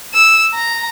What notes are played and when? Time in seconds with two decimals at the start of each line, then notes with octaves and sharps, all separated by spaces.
0.14 E6
0.54 A#5